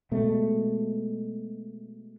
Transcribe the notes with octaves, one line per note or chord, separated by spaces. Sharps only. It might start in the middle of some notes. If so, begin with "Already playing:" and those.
B2 G#3 A3